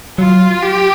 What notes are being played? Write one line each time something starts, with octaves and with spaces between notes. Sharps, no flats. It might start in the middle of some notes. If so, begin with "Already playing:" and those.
F#3 F4
G4